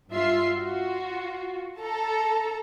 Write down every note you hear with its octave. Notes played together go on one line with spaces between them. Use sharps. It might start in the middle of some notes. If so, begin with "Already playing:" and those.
G2 F4 E5 C7
F4 F#4
A4 A5 A#5